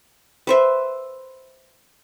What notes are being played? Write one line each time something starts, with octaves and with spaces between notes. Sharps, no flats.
B4 C5 E5